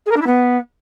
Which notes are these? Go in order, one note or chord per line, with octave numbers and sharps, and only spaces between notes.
G#4
A#4
D4
E4
B3